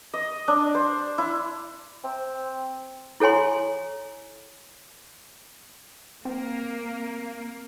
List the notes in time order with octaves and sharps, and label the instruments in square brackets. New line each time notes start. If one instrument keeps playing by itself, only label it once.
[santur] D#5
D4
C5
E4
[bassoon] C4
[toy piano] E4 A4 C#5 G#5 C6
[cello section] A#3 [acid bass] C4